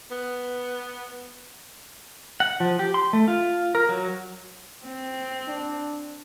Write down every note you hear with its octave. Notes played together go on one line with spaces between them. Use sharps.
B3
F#5
F3
G4
C6
A3
F4
A#4
F#3
C4
D4